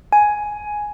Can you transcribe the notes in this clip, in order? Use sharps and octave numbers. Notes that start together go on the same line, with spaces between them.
G#5